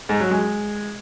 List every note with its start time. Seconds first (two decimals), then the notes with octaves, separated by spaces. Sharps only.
0.09 G#2
0.20 F#3
0.31 G#3